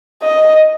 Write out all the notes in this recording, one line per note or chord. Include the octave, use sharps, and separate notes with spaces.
D#5